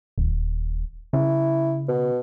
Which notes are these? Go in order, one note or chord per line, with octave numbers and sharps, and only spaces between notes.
D#1
C#3 E4
B2